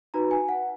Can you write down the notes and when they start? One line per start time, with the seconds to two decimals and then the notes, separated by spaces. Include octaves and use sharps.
0.14 D#4 F#4 B4 A#5
0.31 G#5
0.49 F#5